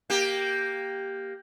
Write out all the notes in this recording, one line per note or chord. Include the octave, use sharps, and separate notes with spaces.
A#3 G4